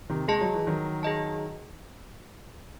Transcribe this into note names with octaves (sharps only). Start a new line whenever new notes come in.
C3 D#3
G#3 G#4 D#5 A5
F#3
E3
D#3 F#3
G#4 D#5 A5